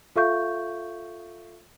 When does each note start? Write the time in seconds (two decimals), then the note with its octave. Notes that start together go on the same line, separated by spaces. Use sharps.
0.16 F4 A4 E5 F5 C#6 G6